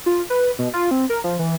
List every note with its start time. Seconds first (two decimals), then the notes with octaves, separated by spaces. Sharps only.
0.06 F4
0.30 B4
0.59 B2
0.73 F4
0.91 C4
1.10 A#4
1.24 F3
1.39 E3